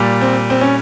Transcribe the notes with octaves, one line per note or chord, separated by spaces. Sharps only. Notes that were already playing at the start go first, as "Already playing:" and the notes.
Already playing: A#2 G3
C4
C4
C#4